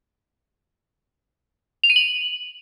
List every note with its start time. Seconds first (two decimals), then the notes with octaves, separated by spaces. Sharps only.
1.84 F7
1.90 D#7
1.96 F#7